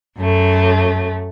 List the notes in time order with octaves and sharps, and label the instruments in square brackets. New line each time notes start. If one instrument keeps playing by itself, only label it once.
[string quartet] F#2 A3